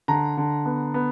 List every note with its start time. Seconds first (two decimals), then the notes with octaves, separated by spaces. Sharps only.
0.08 D3 A#5
0.37 D3
0.66 B3
0.94 B3